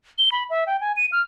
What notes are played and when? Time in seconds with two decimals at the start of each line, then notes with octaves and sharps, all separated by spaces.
0.18 G7
0.32 B5
0.50 E5
0.67 G5
0.81 G#5
0.97 D#7
1.12 F6